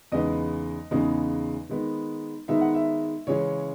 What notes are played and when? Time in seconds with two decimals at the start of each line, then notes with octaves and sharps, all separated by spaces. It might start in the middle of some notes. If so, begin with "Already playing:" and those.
0.12 E2 C#3 G#3 B3 D#4 D#5
0.91 E2 C#3 G#3 B3 D#4
1.69 D#3 G#3 B3 D#4
2.48 D#3 G#3 B3 D#4 E5
2.61 F#5
2.74 E5
3.27 C#3 E3 G#3 C#4 C#5